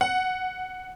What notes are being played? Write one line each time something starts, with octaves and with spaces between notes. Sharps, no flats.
F#5